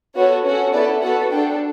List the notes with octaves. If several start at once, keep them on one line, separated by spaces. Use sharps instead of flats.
B3 F#4 A4 C#5
C#4 F#4 A4
B3 E4 A4 D5
B3 F#4 A4 F#5
D4 A4 G5